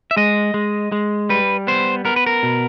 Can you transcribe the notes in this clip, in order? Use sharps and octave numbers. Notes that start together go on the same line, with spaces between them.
E5
G#3 D#5
G#3
G#3
G3 B4
B3 C5
B3 A#4
B4
A#4
B2